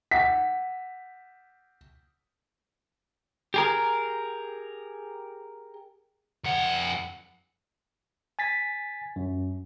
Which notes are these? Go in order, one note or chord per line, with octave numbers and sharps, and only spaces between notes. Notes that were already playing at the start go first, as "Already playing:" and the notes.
F#5 B6
G4 G#4 A#4
F2 F#5
G#5 A6 B6
F#2